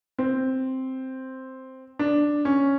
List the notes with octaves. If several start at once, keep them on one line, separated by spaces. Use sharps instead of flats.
C4
D4
C#4